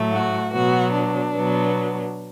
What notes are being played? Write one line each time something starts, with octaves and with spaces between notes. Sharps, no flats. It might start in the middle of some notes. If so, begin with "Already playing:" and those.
Already playing: A2 F#3 A3
F#4
B2 F#3 B3 F#4
D4
B2 F#3 B3